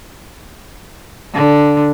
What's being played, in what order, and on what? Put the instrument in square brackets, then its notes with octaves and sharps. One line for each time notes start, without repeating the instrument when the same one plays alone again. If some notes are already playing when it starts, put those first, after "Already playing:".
[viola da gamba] D3